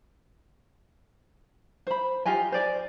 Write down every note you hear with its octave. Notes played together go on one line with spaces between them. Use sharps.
C5 B5
F4 G4 D#5 G#5
C5 D5 G#5